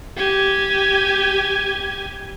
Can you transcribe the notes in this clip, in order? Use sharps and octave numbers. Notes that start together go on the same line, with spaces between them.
G4 G#5